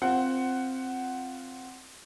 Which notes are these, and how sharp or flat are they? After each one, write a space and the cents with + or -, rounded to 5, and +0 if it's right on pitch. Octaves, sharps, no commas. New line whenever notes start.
C4 +0 F4 +0 F#5 +10